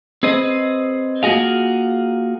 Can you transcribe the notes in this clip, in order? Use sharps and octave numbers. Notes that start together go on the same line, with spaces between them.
C4 G#4 B4 C5 D#5
A#3 F4 F#4 G#4 F5